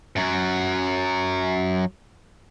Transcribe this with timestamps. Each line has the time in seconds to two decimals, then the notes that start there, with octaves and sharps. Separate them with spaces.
0.16 F#2 F#3